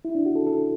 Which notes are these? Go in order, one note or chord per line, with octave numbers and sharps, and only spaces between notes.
E4
D4
F#4
A4
A4